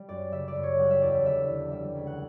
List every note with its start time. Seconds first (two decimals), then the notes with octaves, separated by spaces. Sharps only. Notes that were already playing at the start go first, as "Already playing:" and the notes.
Already playing: G3
0.09 F#2 D5
0.32 C#3 E5
0.48 D5
0.56 F#2
0.63 C#5
0.78 G3 F#5
0.91 E5
1.02 E2 D5
1.14 E5
1.25 D3 E5
1.49 E2
1.72 G3 E5
1.95 C#2
2.07 F#5